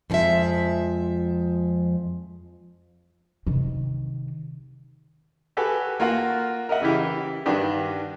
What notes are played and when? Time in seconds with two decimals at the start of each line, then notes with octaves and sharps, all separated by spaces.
0.10 F2 D3 F3 G#3 E5
3.47 C3 D#3
5.57 F#4 G4 A4 B4 G#5
6.00 A#3 F4 F#4 F#5
6.69 A#4 D#5 E5 F#5
6.81 C#3 E3 E4 G4
7.46 G2 D#3 D4 F#4 G4 B4